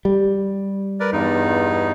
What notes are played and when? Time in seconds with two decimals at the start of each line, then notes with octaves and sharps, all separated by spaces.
0.05 G3
1.00 A#4 B4 D5
1.12 E2 G2 D#4